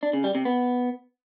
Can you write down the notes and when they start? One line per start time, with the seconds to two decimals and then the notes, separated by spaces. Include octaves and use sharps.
0.03 D4
0.13 C#3
0.24 G3
0.35 C3
0.45 B3